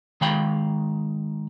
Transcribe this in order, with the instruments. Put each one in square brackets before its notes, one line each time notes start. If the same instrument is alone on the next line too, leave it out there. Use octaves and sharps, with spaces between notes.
[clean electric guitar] D#3 G#3 F5 G5 B5